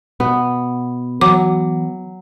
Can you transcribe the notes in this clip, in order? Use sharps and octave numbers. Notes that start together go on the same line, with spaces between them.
B2 B3
E3 F#3 B3 D6